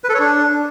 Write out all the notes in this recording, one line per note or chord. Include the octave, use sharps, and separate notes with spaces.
B4
A4
C#5
D4